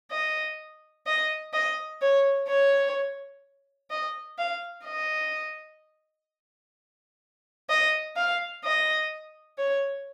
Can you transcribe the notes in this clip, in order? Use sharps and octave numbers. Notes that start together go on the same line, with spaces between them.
D#5
D#5
D#5
C#5
C#5
D#5
F5
D#5
D#5
F5
D#5
C#5